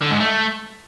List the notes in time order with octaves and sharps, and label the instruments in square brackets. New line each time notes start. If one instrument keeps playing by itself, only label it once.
[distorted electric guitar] D3
G#2
A3